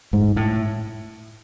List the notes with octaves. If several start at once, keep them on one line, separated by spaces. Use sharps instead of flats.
G#2
A2